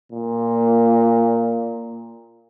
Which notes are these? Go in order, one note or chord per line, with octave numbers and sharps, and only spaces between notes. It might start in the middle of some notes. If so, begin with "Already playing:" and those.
A#2